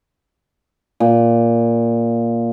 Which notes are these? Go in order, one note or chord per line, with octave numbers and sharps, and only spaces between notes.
A#2